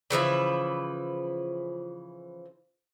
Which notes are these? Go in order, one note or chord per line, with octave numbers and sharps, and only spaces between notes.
C#3 E3 F3 E4